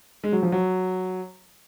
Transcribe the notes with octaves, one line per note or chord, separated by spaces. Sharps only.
G#3
F#3
F3
F#3